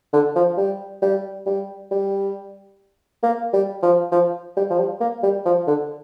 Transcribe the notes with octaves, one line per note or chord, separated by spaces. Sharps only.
D3
F3
G3
G3
G3
G3
A#3
G3
F3
F3
G3
F3
G3
A#3
G3
F3
D3